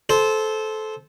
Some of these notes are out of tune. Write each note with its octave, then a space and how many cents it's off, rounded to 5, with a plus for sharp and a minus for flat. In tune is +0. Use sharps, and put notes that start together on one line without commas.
A4 -20 C5 -5